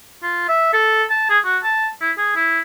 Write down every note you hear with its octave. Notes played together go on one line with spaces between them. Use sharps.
F4
E5
A4
A5
G#4
F#4
A5
E4
G#4
E4